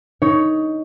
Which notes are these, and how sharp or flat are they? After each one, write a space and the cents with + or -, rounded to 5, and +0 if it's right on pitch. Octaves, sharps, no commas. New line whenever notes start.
D#4 +10 C#5 +10